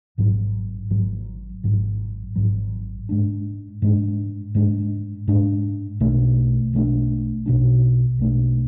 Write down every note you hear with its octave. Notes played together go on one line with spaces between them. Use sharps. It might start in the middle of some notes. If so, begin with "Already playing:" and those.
G#1 G#2 F#3
G#1 G#2 F#3
G#1 G#2 F#3
G#1 G#2 F#3
G#2 G#3 D4
G#2 G#3 D4
G#2 G#3 D4
G#2 G#3 D4
B1 B2 A3 D4
B1 B2 A3 D4
B1 B2 A3 D4
B1 B2 A3 D4